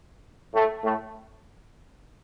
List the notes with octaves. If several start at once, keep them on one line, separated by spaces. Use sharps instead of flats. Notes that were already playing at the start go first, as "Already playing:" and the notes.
A2 A3
A2 A3